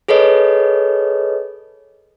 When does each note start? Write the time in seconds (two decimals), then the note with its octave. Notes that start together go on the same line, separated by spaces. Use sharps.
0.08 G#4 A4 B4 C#5 D#5